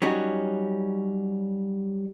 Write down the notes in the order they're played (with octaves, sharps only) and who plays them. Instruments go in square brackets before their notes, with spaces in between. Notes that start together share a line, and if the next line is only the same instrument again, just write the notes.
[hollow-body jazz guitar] F#3 G3 C#4 D#4 F#4